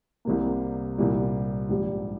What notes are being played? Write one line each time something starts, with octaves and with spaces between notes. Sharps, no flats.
C2 C3 G3 A#3
C2 A#2 G3
A#1 G#2 G3